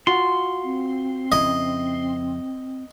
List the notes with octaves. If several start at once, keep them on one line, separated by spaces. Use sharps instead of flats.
F4 F#4 C6
C4
F2 C#3 E4 D#5